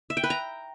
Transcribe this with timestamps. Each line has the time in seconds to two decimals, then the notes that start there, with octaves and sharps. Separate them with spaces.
0.10 E5
0.17 G5
0.23 B4
0.30 A#5